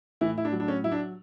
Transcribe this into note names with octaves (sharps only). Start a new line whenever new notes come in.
A2 E3 E4
E4
D4
F#3
D4
C#4
F#3 E4
D4